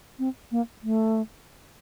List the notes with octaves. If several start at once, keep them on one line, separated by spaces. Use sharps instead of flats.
C4
A#3
A3